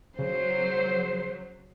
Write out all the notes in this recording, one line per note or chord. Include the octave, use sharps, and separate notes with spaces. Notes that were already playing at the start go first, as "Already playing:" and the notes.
C#3 F#3 C5